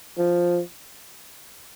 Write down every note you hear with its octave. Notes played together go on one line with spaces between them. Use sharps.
F3